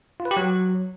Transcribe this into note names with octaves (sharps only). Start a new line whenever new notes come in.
F4
B4
G4
F#3